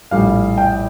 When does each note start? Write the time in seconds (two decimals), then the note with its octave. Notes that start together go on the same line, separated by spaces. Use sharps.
0.11 A#1 A2 G3 F5
0.58 G5